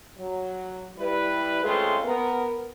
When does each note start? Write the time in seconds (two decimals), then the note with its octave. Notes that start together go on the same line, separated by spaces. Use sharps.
0.17 F#3
0.98 G3 E4 B4
1.64 C#3 G#3 A3 C4 F4 G#4
2.04 B3 A#4